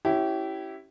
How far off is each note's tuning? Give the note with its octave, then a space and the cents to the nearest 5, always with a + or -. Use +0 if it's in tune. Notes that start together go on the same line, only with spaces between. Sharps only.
C#4 +0 E4 +0 G4 -25